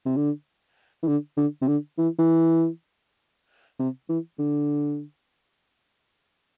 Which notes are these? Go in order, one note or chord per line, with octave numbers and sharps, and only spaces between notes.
C3
D3
E3
D3
D3
C3
D3
E3
E3
C3
E3
D3